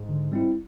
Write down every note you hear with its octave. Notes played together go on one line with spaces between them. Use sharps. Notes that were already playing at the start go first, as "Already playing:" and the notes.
Already playing: G#2
D3
G3 C4 E4